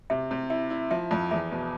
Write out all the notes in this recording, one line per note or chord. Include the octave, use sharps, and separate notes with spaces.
C3 E5
C3
E4 E5
E4
F3 E5
F2
E2 E5
B2